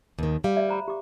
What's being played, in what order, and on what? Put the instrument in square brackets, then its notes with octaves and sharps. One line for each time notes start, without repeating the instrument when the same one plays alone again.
[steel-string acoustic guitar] D#2 D#3
[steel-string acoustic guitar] G3 [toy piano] F5
[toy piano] D5 E5
C5 A#5 B5
G4 D6